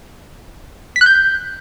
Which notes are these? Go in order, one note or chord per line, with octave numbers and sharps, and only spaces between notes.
B6
F#6
G6